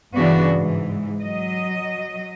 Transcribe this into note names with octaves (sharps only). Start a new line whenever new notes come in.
G2 C#3 E3 B3 D4 F#4
G#2 E3
F#3 D#5